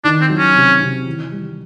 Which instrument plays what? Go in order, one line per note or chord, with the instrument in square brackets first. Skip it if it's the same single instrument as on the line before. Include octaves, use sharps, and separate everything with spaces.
[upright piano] D#3 [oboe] D4
[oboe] C4
[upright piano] F#3
[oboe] C#4
[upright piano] C3
C3
E3
G3